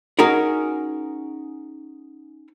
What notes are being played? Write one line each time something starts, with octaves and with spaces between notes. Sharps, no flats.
C#4 D#4 F#4 G#4 A#4